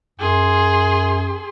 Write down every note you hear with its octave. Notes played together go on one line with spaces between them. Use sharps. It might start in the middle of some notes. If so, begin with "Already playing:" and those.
F#2 G#4 C6